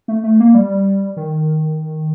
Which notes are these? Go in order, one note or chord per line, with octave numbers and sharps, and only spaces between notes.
A3
A3
A#3
G3
D#3